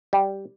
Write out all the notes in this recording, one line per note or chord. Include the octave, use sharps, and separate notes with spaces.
G3